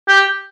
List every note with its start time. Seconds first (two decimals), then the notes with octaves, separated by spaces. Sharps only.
0.08 G4